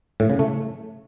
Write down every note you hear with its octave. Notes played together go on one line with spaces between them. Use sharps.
A2
C#3
A3